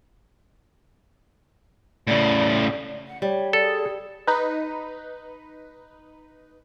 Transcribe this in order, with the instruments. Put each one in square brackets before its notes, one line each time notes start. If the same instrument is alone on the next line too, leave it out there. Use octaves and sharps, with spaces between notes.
[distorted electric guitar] A2 C#3 [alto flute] D5
[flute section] F#5
[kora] G3 [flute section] C#5
[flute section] G#4 D5 [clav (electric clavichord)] A4
[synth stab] D#4 B4